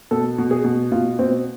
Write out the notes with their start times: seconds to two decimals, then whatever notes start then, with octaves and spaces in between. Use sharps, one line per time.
0.11 B2 A4
0.38 B2
0.51 G#4
0.64 B2
0.92 B2 F4
1.19 B2 C4